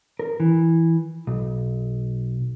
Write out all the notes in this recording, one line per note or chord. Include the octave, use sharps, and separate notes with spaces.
A#4
E3
B1